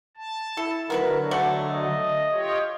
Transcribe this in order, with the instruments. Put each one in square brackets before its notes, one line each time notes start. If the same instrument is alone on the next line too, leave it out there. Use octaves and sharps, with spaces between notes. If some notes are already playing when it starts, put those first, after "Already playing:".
[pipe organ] A5
[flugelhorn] E4 [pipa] A4
[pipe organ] D3 F#3 [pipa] B3 E4 B4 [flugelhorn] A#4
[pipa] A3 D5 F#5 [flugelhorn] A4
[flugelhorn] D#5
[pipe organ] F4 G4 C#5